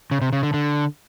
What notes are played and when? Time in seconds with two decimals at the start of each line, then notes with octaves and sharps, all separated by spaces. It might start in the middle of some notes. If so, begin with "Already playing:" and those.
0.11 C#3
0.21 C3
0.33 C#3
0.43 D3
0.54 D3